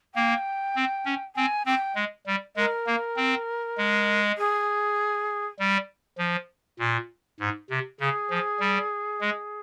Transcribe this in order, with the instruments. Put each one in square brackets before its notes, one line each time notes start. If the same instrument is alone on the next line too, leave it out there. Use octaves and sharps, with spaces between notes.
[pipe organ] A#3 [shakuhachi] G5
[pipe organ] C4
C#4
[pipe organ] C4 [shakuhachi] G#5
[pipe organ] C4 [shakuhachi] G5
[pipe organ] G#3
G3
[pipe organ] G#3 [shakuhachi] A#4
[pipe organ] A#3
C4
G#3
[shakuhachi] G#4
[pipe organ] G3
F3
A#2
G#2
C3
[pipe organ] C#3 [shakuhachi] G#4
[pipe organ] F3
G3
G#3